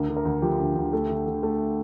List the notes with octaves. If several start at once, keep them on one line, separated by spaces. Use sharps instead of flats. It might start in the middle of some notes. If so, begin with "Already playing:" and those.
Already playing: D2 A#4
D3
A#4
D2
F3 G4
D2
D2
A3
D3
D3
A3